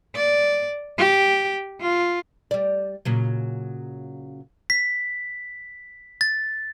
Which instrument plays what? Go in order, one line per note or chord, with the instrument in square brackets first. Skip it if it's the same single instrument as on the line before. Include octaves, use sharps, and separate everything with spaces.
[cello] D5
G4
F4
[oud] G3 D5
A#2 C#3 F#3
[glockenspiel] B6
A6